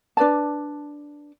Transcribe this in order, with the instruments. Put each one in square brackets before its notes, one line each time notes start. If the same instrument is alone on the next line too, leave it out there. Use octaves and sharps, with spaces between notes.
[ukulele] D4 B4 D5 A5